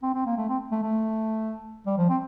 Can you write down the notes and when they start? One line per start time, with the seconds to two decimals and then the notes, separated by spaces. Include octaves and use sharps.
0.03 C4
0.14 C4
0.26 A#3
0.37 A3
0.49 C4
0.72 A3
0.83 A3
1.86 G3
1.98 F3
2.09 C4